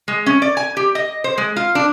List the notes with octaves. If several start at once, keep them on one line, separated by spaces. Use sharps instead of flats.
G#3
C#4
D5
G#5
G4
D#5
C5
G#3
F4
D4